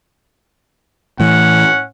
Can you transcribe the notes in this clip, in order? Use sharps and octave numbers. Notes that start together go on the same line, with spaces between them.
A2 E3 C#4 F#5